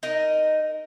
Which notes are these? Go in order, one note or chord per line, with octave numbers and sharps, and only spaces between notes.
D#4 A#4 D#5